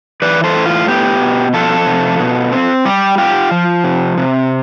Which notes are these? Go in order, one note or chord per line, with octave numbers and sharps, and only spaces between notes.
E3 B4 D5
A4 C5
A2
F4
B3 G4
B2
F3 F4 A4
C3
B2
C4
G3 G4
F4 G4
F3
C3
C3